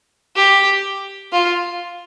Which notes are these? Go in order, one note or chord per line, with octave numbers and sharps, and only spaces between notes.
G4
F4